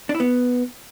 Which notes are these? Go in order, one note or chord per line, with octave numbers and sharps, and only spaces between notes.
D4
E4
B3